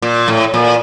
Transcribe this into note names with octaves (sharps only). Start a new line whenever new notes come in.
A#2
A2
A#2